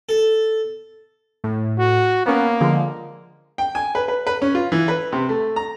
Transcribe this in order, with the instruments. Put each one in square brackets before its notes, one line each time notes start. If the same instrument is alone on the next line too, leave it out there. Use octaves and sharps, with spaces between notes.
[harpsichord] A4
[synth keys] A2
[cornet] F#4
[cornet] A#3 [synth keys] B3 C#4
[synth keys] D3 F3 G#3
[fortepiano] G5
G#5
B4
B4
B4
C#4
F4
E3
B4
C3
A3
A#5